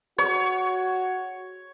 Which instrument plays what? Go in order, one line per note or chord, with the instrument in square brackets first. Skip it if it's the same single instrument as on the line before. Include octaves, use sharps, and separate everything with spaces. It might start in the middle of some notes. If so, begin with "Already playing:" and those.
[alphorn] F#4 [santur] C#5